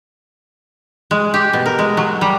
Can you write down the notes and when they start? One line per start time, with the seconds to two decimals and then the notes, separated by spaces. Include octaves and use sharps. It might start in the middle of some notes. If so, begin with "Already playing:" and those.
1.11 G#3
1.34 G4
1.53 B2
1.66 A#4
1.79 G#3
1.97 F#3
2.21 G3